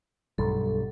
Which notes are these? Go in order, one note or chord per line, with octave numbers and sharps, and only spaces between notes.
B1 G2 A4